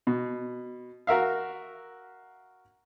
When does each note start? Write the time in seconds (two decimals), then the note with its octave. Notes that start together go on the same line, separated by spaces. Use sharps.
0.07 B2
1.07 F#4 A#4 E5 F5